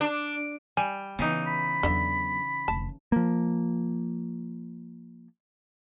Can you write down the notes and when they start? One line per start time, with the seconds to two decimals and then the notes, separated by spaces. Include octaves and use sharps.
0.01 D4
0.77 G3 G#5
1.19 C#3 E3 B3 D#4
1.47 B5
1.83 E2 D3 F#3 D4 E5
2.68 F1 D2 A5
3.12 F3 A#3